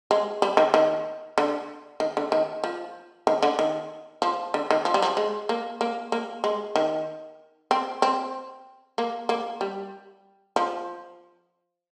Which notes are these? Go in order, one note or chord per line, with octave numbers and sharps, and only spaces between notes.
G#3
G3
D#3
D#3
D3
D#3
D3
D#3
F3
D#3
D3
D#3
F3
D3
D#3
F3
G3
F3
G#3
A#3
A#3
A#3
G#3
D#3
C4
C4
A#3
A#3
G3
F3